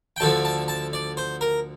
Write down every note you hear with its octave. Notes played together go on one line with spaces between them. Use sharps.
G5
D2 D3 F3 A5
A5
A5
D5
C5
A#4